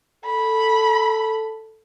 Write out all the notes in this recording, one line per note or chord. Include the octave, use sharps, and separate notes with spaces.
A4 B5